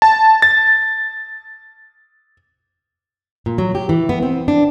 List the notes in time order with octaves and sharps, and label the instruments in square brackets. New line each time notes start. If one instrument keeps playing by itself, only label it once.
[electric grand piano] A5
A6
[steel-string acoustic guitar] A#2
F#3
G4
E3
B3
C4
D4